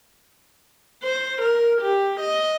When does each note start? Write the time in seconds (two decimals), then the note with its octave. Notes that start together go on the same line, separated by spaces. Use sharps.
1.03 C5
1.41 A#4
1.81 G4
2.20 D#5